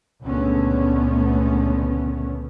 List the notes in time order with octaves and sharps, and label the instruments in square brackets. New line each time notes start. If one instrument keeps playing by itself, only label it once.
[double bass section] C#2 A#2 D3 A3 B3 C#4